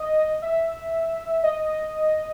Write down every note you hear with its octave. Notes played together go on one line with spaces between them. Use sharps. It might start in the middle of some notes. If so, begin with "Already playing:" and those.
Already playing: D#5
E5
D#5